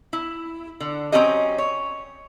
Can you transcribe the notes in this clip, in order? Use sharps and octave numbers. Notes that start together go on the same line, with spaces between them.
E4
D3
F#3 A#3 C4 C#4 G4 D#5
C#5